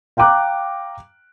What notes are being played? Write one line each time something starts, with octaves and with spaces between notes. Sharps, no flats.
F5 G5 A#5 D6 F#6